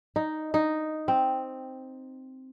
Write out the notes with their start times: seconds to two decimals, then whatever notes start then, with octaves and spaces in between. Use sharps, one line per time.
0.16 D#4
0.54 D#4
1.08 C4